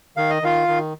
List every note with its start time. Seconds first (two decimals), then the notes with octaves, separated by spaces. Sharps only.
0.17 D#3 F5
0.30 D#5
0.42 D#3 F4 F5
0.68 D#3